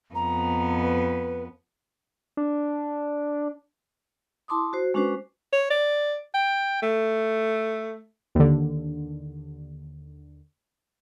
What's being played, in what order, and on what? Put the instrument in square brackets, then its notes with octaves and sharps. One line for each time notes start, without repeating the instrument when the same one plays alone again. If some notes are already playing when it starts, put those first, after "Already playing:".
[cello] F2 B3 [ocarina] A#5
[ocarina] B4
[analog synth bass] D4
[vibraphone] E4 A5 C6 D6 D#6
F#4 C5
G#3 C#4 D4 F#4 B4 C5
[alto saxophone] C#5
D5
G5
A3
[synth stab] D#2 D3